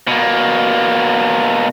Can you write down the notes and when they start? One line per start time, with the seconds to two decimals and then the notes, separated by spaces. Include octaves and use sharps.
0.08 B2 A#3